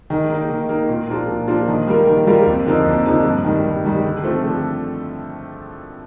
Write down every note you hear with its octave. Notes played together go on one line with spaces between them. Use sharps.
D#3
A#3 D#4
D#3
A#3 D#4
A#2
F3 A#3 D4 F4
A#2
F3 A#3 D4 F4
D#3
G3 A#3 F4 A#4
D#3
G3 A#3 F4 A#4
F2
D3 F3 A#3 D#4
F2
D3 F3 A#3 D#4
G2
D#3 G3
G2
D#3 G3
D3
F3 A3 C4
D3